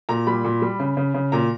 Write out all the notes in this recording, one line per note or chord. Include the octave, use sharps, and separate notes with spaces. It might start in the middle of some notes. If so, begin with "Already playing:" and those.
A#2 A#5
G3 B5
A#2
G3
C#3
C#3
C#3
A#2 A#5